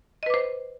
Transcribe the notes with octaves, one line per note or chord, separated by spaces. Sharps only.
B4 C5 D#5 D6